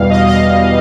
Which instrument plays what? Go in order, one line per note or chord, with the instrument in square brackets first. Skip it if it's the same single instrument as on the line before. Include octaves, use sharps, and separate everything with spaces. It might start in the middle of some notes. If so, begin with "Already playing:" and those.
Already playing: [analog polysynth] E2 B2 G3 F5
D#5
D#5